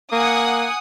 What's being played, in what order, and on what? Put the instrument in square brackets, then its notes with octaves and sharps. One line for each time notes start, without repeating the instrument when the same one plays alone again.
[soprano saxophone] A#3 [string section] F#5 G#5 D#6